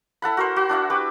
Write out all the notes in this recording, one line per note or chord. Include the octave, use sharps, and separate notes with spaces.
E4 A4 F#5 B5
F#4 A#4 C5
F#4
D4 E4 F#5
G4 B4